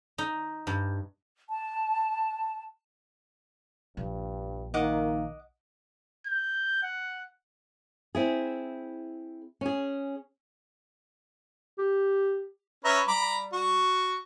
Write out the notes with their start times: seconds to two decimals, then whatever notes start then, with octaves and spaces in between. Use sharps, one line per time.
0.18 D#4
0.67 G2
1.50 A5
3.97 A#1 G2
4.74 D#3 A#3 D#5 F#5 D6
6.27 G6
6.83 F#5
8.15 C4 E4 G#4
9.61 C#4 G#4
11.79 G4
12.85 C#4 B4 E5 A#5
13.08 G3 A#5 B5 D6
13.53 F#4